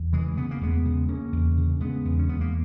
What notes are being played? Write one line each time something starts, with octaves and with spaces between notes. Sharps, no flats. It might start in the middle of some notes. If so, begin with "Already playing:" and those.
Already playing: E2
C#3 E3 G#3
C#3 B3
A#3
E2 G#3 B3
C#3
C#3 A#3 C#4
E2
C#3
C#3 G#3 B3
E2
C#4
E2 B3
A#3